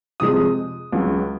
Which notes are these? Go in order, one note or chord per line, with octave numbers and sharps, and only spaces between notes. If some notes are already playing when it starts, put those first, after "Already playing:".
F2 C3 F3 G#3 C4 D#6
C#2 C#3 F#3